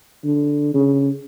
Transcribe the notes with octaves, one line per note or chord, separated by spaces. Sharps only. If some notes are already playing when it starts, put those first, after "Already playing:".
D3
C#3